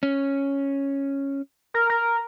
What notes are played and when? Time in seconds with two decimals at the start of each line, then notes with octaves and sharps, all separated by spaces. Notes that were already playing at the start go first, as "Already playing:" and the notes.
0.03 C#4
1.74 A#4
1.90 A#4